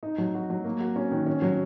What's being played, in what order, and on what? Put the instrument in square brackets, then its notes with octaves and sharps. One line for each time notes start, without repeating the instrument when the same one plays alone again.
[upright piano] D#4
F#3
F#4
F#3
A#3
F#4
C#4
D#3
C#4
F#3